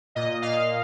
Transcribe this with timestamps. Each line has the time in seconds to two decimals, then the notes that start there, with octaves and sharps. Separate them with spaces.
0.15 A#2 D#5
0.42 A#2 F5